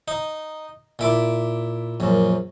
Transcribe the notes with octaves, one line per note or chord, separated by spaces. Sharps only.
D#4
A#2 E4 D6
A#1 F#2